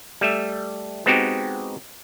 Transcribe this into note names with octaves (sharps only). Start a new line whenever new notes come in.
G3 A3 E5
G#3 B3 C4 D#4 F#4 G4